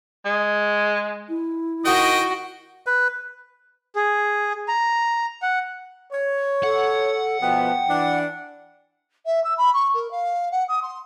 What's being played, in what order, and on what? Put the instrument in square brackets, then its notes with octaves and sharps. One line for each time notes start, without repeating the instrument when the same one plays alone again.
[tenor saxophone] G#3
[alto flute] E4
[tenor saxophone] D#3 [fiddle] F#4 [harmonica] D#5 G5 D#6
[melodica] B4
[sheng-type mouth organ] G#4
A#5
F#5
[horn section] C#5
[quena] A4 [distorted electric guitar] F#5
[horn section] B2 F3 B3 [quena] G5
[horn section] E3 D4
[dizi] E5
E6
B5
C#6
A#4
F5
F#5
D#6
C6